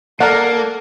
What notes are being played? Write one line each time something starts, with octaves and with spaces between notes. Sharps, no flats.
A#3 A4 A#4 D5 F#5